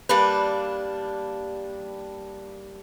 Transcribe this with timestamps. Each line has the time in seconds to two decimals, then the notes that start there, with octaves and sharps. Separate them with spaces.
0.09 G3 A#3 D4 B4